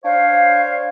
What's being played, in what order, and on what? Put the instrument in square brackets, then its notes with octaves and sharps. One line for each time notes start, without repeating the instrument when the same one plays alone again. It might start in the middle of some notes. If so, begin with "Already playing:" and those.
[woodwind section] D4 C5 C#5 F5